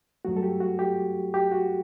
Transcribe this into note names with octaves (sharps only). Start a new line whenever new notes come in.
G2 F#3 A3 F#4
A4
G4
F#4
G4
G4
F#4